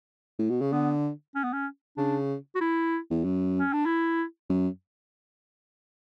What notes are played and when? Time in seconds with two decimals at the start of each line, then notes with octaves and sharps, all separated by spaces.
0.39 A2
0.50 B2
0.61 C#3
0.72 D3 B3
1.35 C#4
1.44 B3
1.53 C#4
1.97 C#3 D4
2.55 F#4
2.61 E4
3.11 E2
3.24 F#2
3.60 C#4
3.73 D4
3.86 E4
4.49 F#2